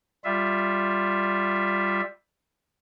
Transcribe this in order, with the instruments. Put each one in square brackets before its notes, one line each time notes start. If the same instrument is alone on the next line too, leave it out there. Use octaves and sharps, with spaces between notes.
[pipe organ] G3 F4 E5